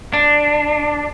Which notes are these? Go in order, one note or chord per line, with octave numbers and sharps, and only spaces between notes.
D4